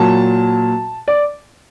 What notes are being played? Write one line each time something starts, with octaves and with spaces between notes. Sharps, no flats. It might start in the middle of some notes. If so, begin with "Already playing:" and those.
Already playing: A#2 F#3 A5
D5